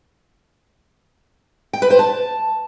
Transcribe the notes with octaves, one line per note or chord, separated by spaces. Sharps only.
G5
B4
C5
A5